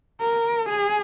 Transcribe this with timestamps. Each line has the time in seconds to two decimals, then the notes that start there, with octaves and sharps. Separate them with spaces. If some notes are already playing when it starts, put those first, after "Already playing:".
0.21 A#4
0.69 G#4